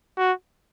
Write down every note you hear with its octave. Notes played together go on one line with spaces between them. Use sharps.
F#4